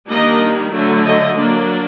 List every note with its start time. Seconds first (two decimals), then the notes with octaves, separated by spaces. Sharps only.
0.08 D#3 G3 A#3 D4 D#5
0.73 D3 F#3 A3
1.05 D#5
1.38 F#3 A#3 D4